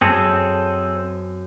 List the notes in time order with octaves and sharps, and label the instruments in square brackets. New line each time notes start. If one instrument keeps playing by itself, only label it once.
[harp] F#2 [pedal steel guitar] C4 G#4 A4